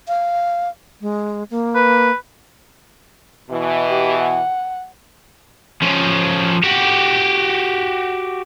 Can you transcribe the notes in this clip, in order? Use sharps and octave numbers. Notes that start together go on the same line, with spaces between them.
F5
G#3
A#3
B4
B2 E3
G4
F#5
F3 C#4
F#4 G4